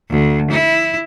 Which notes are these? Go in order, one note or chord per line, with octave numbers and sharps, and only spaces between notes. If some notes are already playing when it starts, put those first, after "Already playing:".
D2
E4